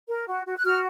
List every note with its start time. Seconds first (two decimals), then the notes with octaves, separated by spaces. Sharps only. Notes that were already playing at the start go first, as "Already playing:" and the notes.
0.08 A#4
0.27 F#4
0.45 F#4
0.56 F#6
0.64 F#4 F6